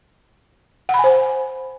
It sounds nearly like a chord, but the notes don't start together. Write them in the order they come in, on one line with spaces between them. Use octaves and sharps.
F#5 B5 G#5 C5